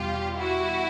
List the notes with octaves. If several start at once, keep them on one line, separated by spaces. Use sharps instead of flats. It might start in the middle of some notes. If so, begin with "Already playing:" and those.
Already playing: E2 B2 G3 F4 G4
E4 F#4